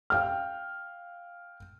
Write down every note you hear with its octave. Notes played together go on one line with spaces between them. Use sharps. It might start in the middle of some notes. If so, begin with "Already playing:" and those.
F5 G5 F6